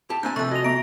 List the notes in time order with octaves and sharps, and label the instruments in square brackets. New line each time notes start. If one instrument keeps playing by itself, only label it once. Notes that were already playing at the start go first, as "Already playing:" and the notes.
[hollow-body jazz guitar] G4 A5
[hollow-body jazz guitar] A#3 C4 G#5 [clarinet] D4 [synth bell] G6
[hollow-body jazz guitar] C3 F3 [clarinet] A4 [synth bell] C#6 F#6
[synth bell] F#4 F7 [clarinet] D#5
[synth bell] B3 D7 [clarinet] A#5